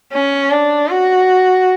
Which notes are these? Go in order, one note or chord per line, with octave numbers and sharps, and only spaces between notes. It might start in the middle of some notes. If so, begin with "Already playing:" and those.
C#4
D4
F#4